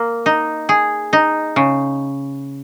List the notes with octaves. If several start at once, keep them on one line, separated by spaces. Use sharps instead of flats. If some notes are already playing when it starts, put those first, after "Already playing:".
Already playing: A#3
D#4
G#4
D#4
C#3